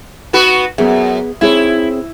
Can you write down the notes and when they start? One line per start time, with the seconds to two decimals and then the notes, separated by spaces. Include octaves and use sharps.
0.33 B3 F#4 B4
0.78 F#2 B3 G#4 E5
1.41 C4 E4 G#4 C#5